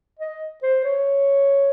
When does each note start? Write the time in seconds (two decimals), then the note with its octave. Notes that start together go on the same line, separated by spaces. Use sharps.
0.19 D#5
0.63 C5
0.85 C#5